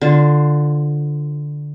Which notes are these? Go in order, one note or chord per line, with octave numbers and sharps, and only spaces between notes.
D3 F4 C5